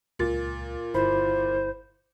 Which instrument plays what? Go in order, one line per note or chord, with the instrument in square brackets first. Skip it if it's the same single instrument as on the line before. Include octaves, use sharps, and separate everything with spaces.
[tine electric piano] C#2 A6 [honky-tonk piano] A#2
[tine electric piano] G1 E4 B5 [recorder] C5